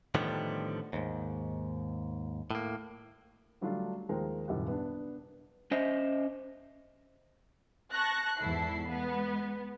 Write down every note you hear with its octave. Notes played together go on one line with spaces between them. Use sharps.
A2 D3 D#3 F3 G3 B3
D#2 G#2
A2 A#3
D3 F#3 G3 A3 D4 F4
D#2 F3 G#3 A#4 C5 G5
D#1 C2 F#2 G3 G4 F#5
B3 D4
C#4 C5 D#5 E5
A5 C#6 F#6 A#6
E2 G#2 E4 A4 C7
G#3 B3